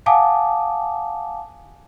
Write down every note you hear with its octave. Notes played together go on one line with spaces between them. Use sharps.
F5 F#5 G#5 A5 D6 D#6